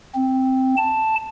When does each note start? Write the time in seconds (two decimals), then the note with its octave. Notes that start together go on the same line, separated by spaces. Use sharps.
0.15 C4
0.77 A5